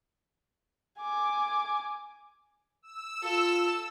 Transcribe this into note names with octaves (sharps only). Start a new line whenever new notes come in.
G#5 D6
E6
F4 A4